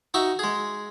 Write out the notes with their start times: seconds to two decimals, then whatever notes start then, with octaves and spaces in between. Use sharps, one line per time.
0.14 D#4 F#4 E5 C#6
0.39 G#3 G#4